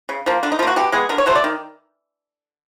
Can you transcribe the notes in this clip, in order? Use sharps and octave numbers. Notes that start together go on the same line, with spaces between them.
C#3
F3 A#3
D3 D4
D#4
F3 A#3 F4 F#4
B2 G4
G#3 B3 G#4
D3 A#4
C#5
F#3 A3 C5
D5
D#3